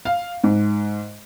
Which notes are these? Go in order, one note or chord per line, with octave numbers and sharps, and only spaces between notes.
F5
G#2